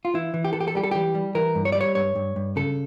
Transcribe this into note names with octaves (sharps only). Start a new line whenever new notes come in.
F4
E3 E4
E3
G4
E3 A4
G4
A4
G3 G4
A4
E3 G4
G3
E3 A#4
G2
C#5
G3 D5
C#5
G2 C#5
G2
G2
C#3 A4